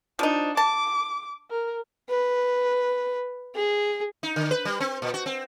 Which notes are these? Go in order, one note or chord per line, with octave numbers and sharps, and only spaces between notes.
F3 D4 D#4
A5 D6
A#4
B4
G#4
D#4
D3
B4
G3
C4
A#2
F#4
C4